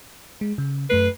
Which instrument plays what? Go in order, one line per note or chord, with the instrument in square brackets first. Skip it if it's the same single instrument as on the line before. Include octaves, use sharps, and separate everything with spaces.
[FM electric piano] G#3
C#3
[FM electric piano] F#2 A3 C7 [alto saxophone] B4